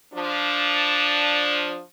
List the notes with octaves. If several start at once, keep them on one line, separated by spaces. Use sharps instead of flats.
F3 D4